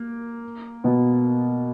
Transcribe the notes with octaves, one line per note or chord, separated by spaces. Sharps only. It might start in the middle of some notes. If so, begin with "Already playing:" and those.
Already playing: A#3
B2 B3